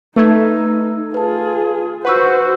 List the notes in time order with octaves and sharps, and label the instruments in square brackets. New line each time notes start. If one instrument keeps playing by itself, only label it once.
[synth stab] A3 [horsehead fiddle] D#4 [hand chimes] B4 E6 G#6
[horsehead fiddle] F4 G#4 [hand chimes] B4 A5
[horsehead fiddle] F#4 C5 [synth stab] B4 [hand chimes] F#5 C#6 E6